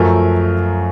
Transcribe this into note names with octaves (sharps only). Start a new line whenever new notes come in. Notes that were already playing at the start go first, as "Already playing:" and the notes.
Already playing: F#2 F3 A3 A#4